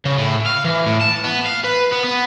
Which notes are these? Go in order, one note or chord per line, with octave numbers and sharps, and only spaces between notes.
C#3
A2
F5
E3
A2
A5
B3
F5
B4
B3
B3